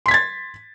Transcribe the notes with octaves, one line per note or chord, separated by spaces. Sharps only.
C6 G#6 A6 B6